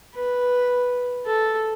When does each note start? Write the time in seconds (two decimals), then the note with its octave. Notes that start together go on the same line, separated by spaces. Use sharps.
0.15 B4
1.26 A4